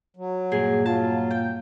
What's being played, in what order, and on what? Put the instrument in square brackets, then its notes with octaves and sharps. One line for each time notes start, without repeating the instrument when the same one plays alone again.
[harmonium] F#3
[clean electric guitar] G2 A#2 [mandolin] G#4
[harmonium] F#3 [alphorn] F4 [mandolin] A5
[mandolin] G5